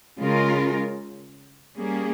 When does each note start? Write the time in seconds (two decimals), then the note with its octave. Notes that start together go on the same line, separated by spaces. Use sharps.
0.19 C#3 G#3 C#4 F4 A#4
1.76 G3 A#3 C#4 G#4